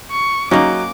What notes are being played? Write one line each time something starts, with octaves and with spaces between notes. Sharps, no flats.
C#6
F#3 A#3 C#4 D#4 D6